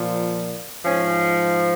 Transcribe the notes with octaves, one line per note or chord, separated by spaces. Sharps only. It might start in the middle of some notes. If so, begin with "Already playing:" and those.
Already playing: A#2 F3
G#2 F3 C#4